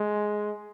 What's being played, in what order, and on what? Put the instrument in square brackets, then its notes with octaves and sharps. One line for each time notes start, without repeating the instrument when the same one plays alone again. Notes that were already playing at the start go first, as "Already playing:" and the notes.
Already playing: [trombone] G#3